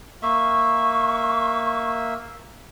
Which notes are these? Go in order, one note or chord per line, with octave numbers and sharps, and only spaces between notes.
A#3 E5 C#6